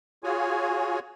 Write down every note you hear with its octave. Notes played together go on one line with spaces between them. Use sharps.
F4 F#4 G#4 C#5 G#5